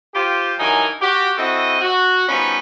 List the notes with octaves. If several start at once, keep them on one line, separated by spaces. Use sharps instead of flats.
F4 G4 C5
G2 E3 F#3 D#4 A#4 G#5
F#4 G4
C4 E4 F#4 A4 D#5
F#4
F3 G3 B3 C#4 D#4 B4